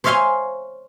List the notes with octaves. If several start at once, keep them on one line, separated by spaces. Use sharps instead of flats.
C5 C#5 E5 F5 G#5 C6